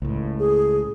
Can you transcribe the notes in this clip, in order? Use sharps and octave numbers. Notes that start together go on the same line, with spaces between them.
C#2 A2
G#4